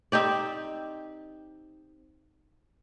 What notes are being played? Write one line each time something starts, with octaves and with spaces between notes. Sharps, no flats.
C4 D#4 G4 D5